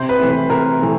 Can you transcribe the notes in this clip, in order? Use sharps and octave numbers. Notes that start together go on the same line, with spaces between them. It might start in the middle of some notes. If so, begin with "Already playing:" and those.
Already playing: C3 C5
B4
E3 A3 C4
B4
C3 A#4
E3 A3 C4